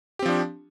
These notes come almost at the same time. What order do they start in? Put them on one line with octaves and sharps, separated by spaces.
G4 C4 F3 D4